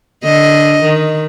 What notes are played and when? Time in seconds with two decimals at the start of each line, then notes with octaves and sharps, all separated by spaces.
0.24 D3 D#5
0.83 D#3